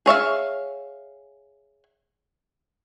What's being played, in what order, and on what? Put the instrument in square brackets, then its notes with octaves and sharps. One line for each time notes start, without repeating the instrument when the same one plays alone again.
[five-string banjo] G#4 C#5 E5 F5